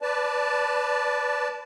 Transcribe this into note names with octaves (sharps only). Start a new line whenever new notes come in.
B4 D5 A5